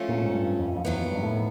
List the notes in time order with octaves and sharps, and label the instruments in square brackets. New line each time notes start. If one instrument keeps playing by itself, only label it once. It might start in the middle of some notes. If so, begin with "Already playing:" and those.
Already playing: [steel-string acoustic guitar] F3 A3 C#4
[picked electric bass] A#2
A2
G#2
G2
F2
F2
[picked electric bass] E2 [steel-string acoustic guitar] C3 D#3 F#3 B3
[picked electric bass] F2
G2
A2